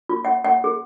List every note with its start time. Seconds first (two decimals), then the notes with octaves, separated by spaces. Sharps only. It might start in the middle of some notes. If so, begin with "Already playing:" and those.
0.09 F4
0.25 F#5
0.45 F#5
0.64 G#4